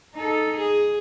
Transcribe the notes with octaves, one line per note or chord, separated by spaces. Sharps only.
D#4 A4
G#4